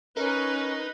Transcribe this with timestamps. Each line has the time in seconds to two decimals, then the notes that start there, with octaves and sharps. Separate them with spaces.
0.17 C#4 D#4 A#4 B4